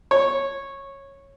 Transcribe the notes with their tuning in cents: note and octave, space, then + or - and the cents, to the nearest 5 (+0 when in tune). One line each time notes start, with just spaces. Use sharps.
C#5 -10